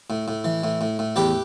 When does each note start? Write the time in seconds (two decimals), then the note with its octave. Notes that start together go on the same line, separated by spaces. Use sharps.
0.10 A2
0.28 A2
0.45 E3
0.64 A2
0.81 A2
0.99 A2
1.16 E2 G4 B4